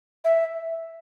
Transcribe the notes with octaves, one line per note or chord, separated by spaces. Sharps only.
E5